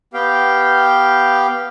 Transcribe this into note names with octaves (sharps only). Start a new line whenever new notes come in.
B3 G4 F5 G5